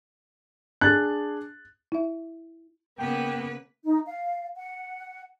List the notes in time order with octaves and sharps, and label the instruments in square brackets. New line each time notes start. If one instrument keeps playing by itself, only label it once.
[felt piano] D4 G#4 [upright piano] F#6 A6
[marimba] E4 E5
[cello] C#3 B4 [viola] A#3 B3 [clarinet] G5
[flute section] D#4
F5
F#5